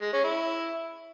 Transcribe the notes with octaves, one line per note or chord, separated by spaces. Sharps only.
G#3
C#4
E4